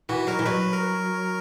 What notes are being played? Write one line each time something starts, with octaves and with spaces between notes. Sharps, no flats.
E3 F#4
F#3 A#4
E3
F#3 B4
A#4